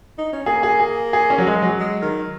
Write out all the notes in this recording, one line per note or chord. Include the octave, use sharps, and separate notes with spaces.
D#4
C#4
A#3 G#4
G#4
G#4
G#4
C#4
F#3
G#3
F#3
G#3
D#3